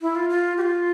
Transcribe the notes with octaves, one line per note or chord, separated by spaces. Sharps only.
E4
F4
F4
G4
F4